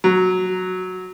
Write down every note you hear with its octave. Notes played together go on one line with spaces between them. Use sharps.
F#3